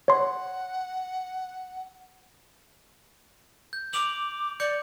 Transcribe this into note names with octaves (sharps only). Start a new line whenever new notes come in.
C#5 F#5 C6
G6
D6 D7 F7 F#7
D5 D6 G6 C#7